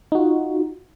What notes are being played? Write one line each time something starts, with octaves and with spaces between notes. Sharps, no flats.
D#4 F4 F#4